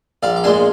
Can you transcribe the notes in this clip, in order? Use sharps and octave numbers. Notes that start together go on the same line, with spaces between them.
A#1 D5 F5
D6
A#2 G#3 D4 G#5 C6